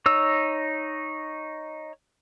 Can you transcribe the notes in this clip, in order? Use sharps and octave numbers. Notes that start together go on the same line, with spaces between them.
D#4 C#5 E6